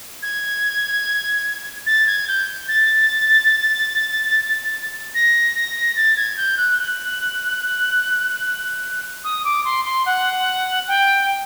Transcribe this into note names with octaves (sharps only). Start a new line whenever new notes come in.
G#6
A6
G#6
G6
A6
A#6
A#6
A6
G#6
G6
F#6
F#6
D#6
D6
C6
C6
F#5
G5